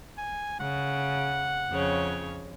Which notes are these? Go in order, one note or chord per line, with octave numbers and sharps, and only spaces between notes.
G#5
C#3 F#5
F2 C#3 C#5